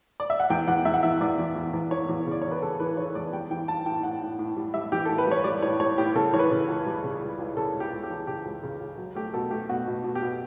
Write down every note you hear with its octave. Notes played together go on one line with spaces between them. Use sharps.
D5
E5
F#5
E2 G5
E2 F#5
E2 E5
F#5
E3 E5
E2 D5
E2
E2
E2
E3 C#5
E2
C#3 D5
E3 C#5
B4
C#3 A4
E3 B4
E3 C#5
E2 D5
G3 G5
E3 G5
A2 A5
A2 G5
A2 F#5
A2
A2
G3
G3 E5
E3 G4
A2 A4
B4
G3 C#5
G3 D5
A2 C#5
G3 C#5
A2 G4
C#3 A4
E3 C#5
B4
C#3
C#2
G3
C#3
C#2
C#2
C#3 A4
G3
G4
C#2
G4
E3
C#3 G4
C#2
C#3
C#2
F#3
A3 G4
B2 A4
A3 G4
B2 F#4
B2
B2
G4
B2